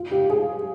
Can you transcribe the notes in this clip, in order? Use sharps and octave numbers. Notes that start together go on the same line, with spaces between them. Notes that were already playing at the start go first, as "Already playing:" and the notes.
Already playing: F4
G4
G#4